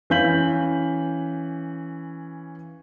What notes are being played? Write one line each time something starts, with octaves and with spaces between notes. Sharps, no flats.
E3 C#4 F5 G6 B6 F#7